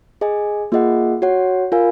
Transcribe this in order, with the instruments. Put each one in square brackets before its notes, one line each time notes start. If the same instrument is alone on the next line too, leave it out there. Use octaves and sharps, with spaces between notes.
[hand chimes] G#4 D#5 G#5
A#3 F4 G#4 D#5 F#5
F#4 C#5 F#5
F4 A#4 F5 G#5